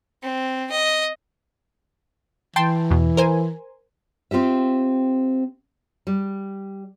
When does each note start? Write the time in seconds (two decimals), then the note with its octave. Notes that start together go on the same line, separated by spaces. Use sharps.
0.23 C4
0.71 D#5
2.56 E3 G5 A5 C6
2.91 E2 B2
3.17 A#4 C5 G#5
4.31 C4 F4 G4 E5
6.07 G3